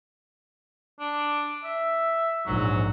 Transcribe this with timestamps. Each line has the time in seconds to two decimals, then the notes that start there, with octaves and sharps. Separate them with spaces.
1.00 D4
1.64 E5
2.46 A#1 G#2 F#3